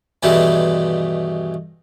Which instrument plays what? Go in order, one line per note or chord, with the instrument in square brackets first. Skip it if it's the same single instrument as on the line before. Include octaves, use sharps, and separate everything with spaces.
[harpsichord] G2 B2 D#3 E3 G#3 A3